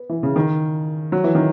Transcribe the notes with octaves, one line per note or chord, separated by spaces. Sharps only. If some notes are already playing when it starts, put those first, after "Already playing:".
Already playing: B3
E3
C#3
D#3
F#3
E3
D#3